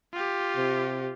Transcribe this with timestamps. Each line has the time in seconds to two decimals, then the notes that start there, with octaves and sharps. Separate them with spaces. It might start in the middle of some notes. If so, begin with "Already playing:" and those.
0.13 F4 G4
0.57 C3